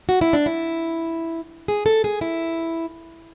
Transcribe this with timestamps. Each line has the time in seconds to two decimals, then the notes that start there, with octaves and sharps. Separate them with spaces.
0.09 F#4
0.21 E4
0.33 D4
0.46 E4
1.68 G#4
1.86 A4
2.04 G#4
2.21 E4